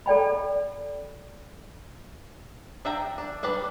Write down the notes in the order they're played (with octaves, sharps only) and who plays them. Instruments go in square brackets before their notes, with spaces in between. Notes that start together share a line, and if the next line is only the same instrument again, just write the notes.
[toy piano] A4 D5 G5 B5
[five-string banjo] D4 E5 G5 A#5
D4
G3 D4 B4 D5